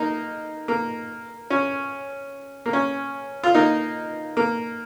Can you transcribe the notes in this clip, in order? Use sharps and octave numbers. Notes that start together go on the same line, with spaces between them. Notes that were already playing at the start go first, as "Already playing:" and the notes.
Already playing: A#3 D#4
A#3
C#4
A#3
C#4
F4
A#3 D#4
A#3